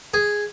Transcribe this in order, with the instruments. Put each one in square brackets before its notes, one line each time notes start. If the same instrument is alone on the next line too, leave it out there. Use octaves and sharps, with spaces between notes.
[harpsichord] G#4